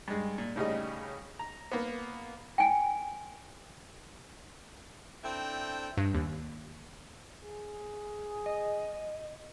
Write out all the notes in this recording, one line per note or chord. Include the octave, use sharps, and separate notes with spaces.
G2 G#3
A#2
A2 C#3 G3 D#4
A#5
A#3 B3
G5 G#5
C4 D4 E4 A4 G5
G2
D#2
G#4
D#5